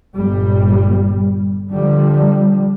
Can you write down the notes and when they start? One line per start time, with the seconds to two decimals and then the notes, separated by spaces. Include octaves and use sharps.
0.15 G1 A#2 G3
1.71 D3 F3 G3